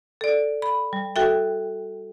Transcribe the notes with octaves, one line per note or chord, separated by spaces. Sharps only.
A4 D5
B5
G3
F#4 A4 E5 G5